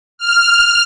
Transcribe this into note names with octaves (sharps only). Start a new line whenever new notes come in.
F6